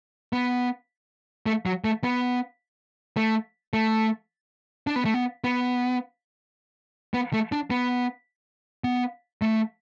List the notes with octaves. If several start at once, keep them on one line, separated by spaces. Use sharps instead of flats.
B3
A3
F#3
A3
B3
A3
A3
D4
B3
A3
B3
B3
B3
A3
D4
B3
B3
A3